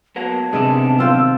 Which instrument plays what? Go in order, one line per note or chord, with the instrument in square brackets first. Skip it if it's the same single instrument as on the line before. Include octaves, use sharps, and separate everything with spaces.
[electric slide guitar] F#3 A#3 B3 [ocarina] A5
[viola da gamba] C3 [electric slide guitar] D#3 B3 D4 [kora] G#3 D#5 E5
[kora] C4 F4 G5 [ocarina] E6